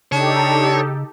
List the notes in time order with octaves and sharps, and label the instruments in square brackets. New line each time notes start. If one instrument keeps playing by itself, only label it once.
[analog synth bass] C#3 [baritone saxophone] D4 [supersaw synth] D#4 G4 A4 [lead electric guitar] C#5